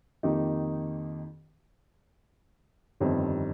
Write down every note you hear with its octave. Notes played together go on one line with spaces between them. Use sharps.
F2 D#3 A#3 D#4 G4
G1 F2 D#3 G3 C4